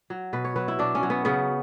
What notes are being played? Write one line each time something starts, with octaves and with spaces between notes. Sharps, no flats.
F#3
B2 B4
C#5
F#3 B4
E4
B2 D4
C#4
F#3
B3
C#3 B3